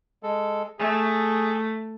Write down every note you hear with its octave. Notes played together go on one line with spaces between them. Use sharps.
G#3 A4
A3 G#4